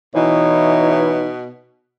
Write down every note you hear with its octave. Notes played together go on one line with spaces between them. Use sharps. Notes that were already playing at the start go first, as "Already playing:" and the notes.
B2 E3 D#4 C#5